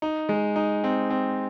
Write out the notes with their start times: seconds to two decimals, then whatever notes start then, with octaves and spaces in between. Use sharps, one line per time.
0.02 D#4
0.29 G#3
0.56 D#4
0.84 C4
1.10 C4